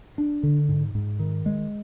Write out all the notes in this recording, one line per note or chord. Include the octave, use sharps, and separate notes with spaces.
D4
D3
G#2
G#2
D#3
G#3